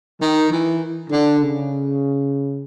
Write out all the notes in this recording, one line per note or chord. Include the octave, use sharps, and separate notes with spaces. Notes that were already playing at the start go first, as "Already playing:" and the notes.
D#3
E3
D3
C#3